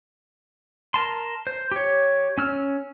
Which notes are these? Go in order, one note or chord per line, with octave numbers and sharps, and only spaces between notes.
A#4 A5 C6
C5
G4 C#5
C#4 E6 F6